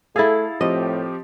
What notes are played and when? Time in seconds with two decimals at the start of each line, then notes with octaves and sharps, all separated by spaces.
0.16 A3 E4 G#4 A4 F5 E6 A6
0.61 A2 F3 C4 G4 D#5